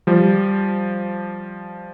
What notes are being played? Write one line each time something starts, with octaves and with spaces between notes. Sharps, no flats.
F3 G3